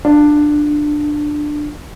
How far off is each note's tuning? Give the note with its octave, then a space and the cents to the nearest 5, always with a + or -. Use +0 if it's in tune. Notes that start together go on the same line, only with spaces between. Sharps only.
D4 +15 F4 +0